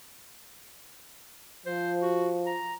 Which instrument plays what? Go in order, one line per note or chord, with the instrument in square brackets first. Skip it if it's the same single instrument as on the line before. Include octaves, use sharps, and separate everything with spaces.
[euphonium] F3 [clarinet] C5
[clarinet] F#4
A#5